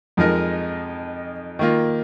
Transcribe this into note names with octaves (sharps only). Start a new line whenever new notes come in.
F2 F3 G#3 D#4 A#4
D#3 A#3 F4